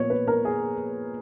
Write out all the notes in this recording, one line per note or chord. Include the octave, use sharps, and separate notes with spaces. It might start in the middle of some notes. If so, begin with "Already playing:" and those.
Already playing: A#2 F3 B3 C#5
B4
A#4
G#4